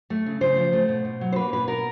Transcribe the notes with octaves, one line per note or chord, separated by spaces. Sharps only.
A3
C#3
C#3 C5
F3
A3
B2
B2
F#3
C5
A#3 B4
B2 B4
B2 A#4